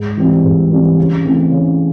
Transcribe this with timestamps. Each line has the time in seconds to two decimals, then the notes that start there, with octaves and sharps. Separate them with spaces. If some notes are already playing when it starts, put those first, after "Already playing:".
Already playing: G#2
0.17 E3 G3 C4
0.44 G#2
0.70 E3 G3 C4
0.98 C#3
1.25 E3 A3 C4
1.51 C#3